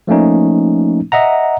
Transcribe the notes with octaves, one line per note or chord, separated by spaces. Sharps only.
F3 A3 A#3 C#4 D#4
D#5 E5 F#5 A#5